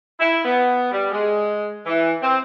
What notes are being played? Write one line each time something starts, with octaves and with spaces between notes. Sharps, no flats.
E4
B3
G3
G#3
E3
C4